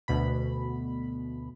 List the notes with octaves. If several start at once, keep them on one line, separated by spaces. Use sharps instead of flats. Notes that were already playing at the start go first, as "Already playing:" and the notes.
D2 B2 B5